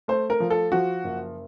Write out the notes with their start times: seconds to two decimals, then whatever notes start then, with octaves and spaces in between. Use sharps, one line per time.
0.08 A3 C5
0.30 A#4
0.40 F3
0.50 A4
0.72 F3 F#4
1.04 F#1